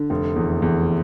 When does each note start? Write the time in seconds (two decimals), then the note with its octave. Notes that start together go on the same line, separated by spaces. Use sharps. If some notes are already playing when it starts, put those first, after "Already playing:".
Already playing: D3
0.10 F1
0.36 E2
0.62 E2